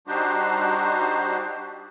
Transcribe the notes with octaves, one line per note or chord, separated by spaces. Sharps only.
G3 D4 D#4 F#4 G4 C5